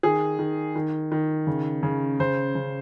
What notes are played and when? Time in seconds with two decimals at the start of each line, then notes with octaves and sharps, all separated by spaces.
0.03 D#3 G#4
0.39 D#3
0.75 D#3
1.12 D#3
1.47 C#3
1.83 C#3
2.20 C#3 C5
2.55 C#3